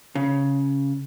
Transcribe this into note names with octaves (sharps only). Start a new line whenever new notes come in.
C#3